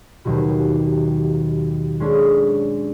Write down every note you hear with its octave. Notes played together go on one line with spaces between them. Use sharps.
D#2 B2 D#3 F#3 G3
G#3 C#4 D4 A4